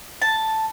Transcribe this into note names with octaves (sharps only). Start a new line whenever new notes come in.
A5